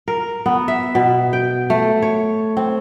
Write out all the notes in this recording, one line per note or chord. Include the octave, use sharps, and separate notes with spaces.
A#4
B3
E5
B2
G5
A3
C#5
C4